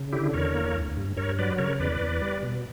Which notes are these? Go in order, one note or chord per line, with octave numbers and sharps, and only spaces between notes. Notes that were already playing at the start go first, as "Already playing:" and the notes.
Already playing: C#3
D3 E4 G4
E2 A#4 C#5
A#3
D2
G2
G2 A#4 C#5
F#3 B4 D5
C#3 A#4 C#5
E2 B4 D5
E2
G3
B2